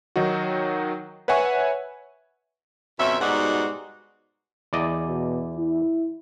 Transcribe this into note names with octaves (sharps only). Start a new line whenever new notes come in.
D#3 F#3 D#4 F#4
B4 C#5 E5 F#5 G#5 C#6
F2 B2 C#4 E5
G#2 B2 G3 D#4 F#4
E2 D5 D#5
B2
E4